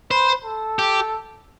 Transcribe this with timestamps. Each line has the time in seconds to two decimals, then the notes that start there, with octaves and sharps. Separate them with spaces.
0.11 B4 C5
0.44 A4
0.79 G4